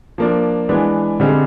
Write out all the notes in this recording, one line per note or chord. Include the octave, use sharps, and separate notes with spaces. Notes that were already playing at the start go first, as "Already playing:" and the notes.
F3 A#3 D4
E3 G#3 B3 D4
D3 G3 C4 D#4 G#4